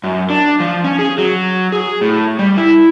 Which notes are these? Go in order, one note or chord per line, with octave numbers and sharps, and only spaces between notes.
F#2
D4
F3
C#4
G#4
F#3
G#4
A2
G3
E4